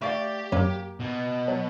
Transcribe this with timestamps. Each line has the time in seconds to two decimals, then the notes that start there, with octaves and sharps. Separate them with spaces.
0.02 A3 G4 D5 F5
0.52 F#2 F#3 A#3
1.00 B2
1.48 F#3